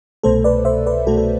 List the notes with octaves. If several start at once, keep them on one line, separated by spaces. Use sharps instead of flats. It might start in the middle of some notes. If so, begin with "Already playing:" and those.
C2 B2 A3 A4 C5
B4 D5
C5 E5
B4 D5
C2 B2 A3 F#4 A4
A4